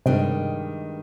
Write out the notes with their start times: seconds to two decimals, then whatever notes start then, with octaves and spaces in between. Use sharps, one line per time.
0.06 G2 C3 D#3 G#3 D4